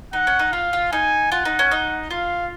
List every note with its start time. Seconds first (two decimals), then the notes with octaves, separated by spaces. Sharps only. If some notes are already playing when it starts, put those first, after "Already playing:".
0.13 D#4 F#5
0.27 C#4
0.39 D#4
0.52 F4 F5
0.73 F4
0.92 D#4 G#5
1.32 F4 F#5
1.45 D#4
1.59 C#4
1.72 D#4
2.11 F4 F5